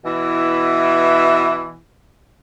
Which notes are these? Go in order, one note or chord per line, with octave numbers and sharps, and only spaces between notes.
B2 E3 E4